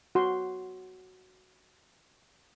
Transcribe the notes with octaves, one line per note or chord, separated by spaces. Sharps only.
F#4 C6